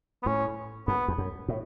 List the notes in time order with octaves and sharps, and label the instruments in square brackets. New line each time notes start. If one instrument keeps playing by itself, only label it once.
[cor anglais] B3
[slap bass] A2 [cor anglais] C#4
[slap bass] F#2 [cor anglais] B3
[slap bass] E2
F#2
A2